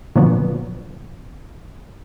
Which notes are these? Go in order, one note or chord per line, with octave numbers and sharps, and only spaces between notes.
A#2 D3 F3 F#3 B3